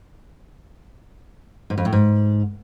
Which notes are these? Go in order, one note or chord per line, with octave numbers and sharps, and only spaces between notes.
G#2
F2
A2
G#2